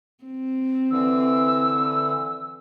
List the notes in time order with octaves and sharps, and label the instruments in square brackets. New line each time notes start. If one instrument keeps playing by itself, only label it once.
[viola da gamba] C4
[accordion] D3 E3 [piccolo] E6